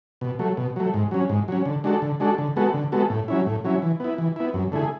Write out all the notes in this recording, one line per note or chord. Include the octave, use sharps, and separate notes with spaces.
B2
F#3 A3
B2
F#3 A3
G#2
F#3 C#4
G#2
F#3 C#4
D3
G#3 D4 F#4 A4
D3
G#3 D4 F#4 A4
D3
G#3 B3 F#4 A4
D3
G#3 B3 F#4 A4
A2
F#3 C#4 E4
A2
F#3 C#4 E4
E3
B3 E4
E3
B3 E4
F#2
D3 A3 E4 G#4